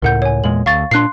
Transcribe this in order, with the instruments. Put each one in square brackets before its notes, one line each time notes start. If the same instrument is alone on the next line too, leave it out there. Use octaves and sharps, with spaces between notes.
[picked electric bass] C#2 A2 [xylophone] A#4 F#5 G6
[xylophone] C#5 G#5
[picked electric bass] E2 A#2 G#3 [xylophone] F#7
[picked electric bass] D2 [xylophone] F5 C#6 A6
[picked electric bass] A#2 D4 [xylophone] C6 F#6 C7